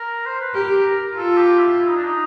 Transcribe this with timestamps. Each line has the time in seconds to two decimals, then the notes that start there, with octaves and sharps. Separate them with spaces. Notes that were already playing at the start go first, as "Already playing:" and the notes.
Already playing: A#4
0.26 C5
0.41 B4
0.54 G4 A#4
1.16 F4 A4
1.37 G4
1.59 E4
1.79 E4
1.87 D#4
1.96 D4
2.05 D#4